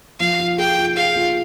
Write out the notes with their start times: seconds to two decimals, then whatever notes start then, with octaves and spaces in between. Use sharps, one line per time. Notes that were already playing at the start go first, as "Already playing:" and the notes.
0.20 F3 F5
0.39 F4
0.58 G#4 G5
0.78 F4
0.96 G#4 F5
1.15 F4